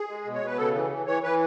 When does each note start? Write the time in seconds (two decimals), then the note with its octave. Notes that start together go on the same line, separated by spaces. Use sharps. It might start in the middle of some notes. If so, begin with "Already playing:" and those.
Already playing: G#4
0.08 G#3
0.25 B2
0.35 C#5
0.41 B2 B4
0.57 C#3 A4
0.74 E3
0.90 E3
1.06 E3 C#5
1.23 E3 B4